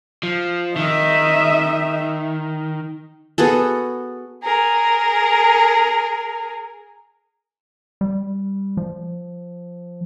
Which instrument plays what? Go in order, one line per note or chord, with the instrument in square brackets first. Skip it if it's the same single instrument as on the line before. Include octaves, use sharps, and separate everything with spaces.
[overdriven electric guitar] F3
[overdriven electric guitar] D#3 [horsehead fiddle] D#5 E5
[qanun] B3 F#4 G#4 A4
[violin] G#4 A#4
[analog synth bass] G3
F3